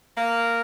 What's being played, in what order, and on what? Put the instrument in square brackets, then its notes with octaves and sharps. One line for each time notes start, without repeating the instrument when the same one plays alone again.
[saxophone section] A#3